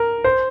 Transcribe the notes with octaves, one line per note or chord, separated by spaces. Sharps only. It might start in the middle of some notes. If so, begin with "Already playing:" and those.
Already playing: A#4
C5